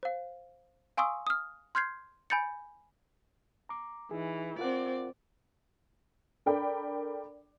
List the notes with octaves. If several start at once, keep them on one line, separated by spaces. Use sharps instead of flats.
C5 F5
F5 G#5 C6 C#6 D#6 E6
D#6 F6
C6 F6 G6 G#6 C7
G#5 B5 G6 A6 C#7
A#5 D6
E3 D#4 E4 G#4
C4 F4 A#4 D5 F#5
D4 A4 A#4 D5 G5 B5